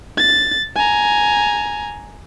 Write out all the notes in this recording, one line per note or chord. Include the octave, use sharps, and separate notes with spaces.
A6
G#5 A#5